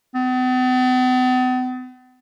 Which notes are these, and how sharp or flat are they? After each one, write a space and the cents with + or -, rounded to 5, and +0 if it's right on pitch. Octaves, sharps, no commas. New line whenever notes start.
B3 +45